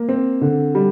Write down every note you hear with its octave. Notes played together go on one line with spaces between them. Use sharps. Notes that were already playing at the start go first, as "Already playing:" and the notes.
Already playing: A#3
C4
D3
G3